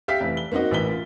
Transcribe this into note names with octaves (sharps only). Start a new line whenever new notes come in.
G4 E5 F5 G5 B6
F1 E3
G7
A#3 C4 D#4 F#4 D#5
A1 E3 A#4 B6 G7
F4